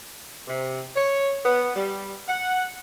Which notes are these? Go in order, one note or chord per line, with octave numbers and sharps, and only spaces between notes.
C3
C#5
B3
G3
F#5